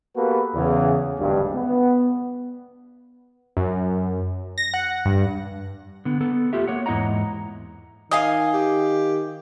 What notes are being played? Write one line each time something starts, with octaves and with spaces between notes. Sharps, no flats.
A#3 B3 F#4 G4 A4 B4
E2 C#3
G#1 D2 G2
B3
F#2
A#6
F#5
G2
D3 B3
B3 A4
A3 F4 G4 E5
A#3 C#5 F#5
E2 G#2 E4 D#5 F#5 A#5
D#3 D#5 F5 G#5 D6
G4